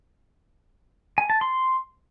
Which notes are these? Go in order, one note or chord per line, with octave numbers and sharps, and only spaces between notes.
G#5
A5
C6